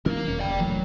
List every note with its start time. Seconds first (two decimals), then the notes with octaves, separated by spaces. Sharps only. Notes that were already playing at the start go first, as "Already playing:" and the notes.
0.06 D#3 F#3 C#4 A#4 F5
0.28 E1 C#4
0.39 F#1 E2 D5 G5
0.61 D#1 E3 F#3 A3